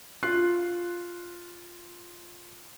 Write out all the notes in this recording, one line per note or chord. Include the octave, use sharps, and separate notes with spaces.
F4 F#6 C7